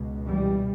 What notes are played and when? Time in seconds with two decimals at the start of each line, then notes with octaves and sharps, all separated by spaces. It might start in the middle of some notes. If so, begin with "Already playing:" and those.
Already playing: C#2 B2
0.28 E3 G3